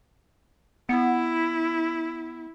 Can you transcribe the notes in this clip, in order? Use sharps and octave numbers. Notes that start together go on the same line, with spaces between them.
B3 E4